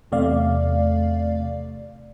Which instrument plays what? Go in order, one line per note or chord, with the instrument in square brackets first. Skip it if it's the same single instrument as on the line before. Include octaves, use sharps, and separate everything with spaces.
[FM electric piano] E2 C3 A3 D5 F5